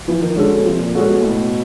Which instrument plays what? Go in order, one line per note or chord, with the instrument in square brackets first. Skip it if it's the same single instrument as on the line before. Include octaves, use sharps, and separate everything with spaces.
[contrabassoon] E3 [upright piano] F3
[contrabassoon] D#3
[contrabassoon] D3 [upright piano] G#3 C#4 F#4 A4
[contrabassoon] B2
[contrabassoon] C3 [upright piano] F3
[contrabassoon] A#2
[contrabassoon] A#2 [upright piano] G#3 C#4 F#4 A4
[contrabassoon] B2
[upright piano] A2